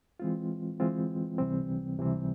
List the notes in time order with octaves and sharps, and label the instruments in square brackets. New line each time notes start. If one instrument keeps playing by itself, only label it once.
[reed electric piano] E3 G#3 C4 F4
E3 G#3 C4 F4
C#2 C3 E3 G3 C4
C#2 C3 E3 G3 C4